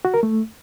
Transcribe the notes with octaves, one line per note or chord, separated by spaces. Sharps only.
F#4
A#4
A3